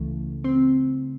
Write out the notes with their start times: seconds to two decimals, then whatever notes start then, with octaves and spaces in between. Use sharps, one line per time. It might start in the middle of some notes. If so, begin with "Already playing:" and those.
Already playing: C#2 C#3 E3 A3
0.44 C4